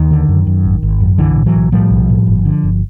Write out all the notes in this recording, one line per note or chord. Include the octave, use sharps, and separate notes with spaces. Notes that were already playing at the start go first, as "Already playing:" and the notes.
Already playing: D#2 D#3
D3
F#2
F#2
G#1
G#1
F#2
B1 D3 E3
A2
E3 F#3
B1
A2 F3 G3
B1
A2
G1
D3
G1